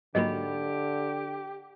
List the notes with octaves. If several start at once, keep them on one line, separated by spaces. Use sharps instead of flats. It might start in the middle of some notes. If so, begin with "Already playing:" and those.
G#2 D3 F#3 A#3 G4 D#5 B5